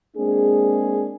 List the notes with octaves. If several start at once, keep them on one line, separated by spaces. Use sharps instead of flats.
G#3 A#3 C4 D4 G#4